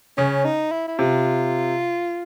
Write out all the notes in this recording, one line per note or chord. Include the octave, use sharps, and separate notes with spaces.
C#3 C#4
D#4
E4
E4
C3 F4